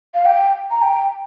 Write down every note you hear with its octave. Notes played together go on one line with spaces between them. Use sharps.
F5
G5
A#5
G5